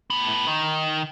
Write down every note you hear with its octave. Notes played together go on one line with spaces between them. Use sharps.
A2 B3
D#3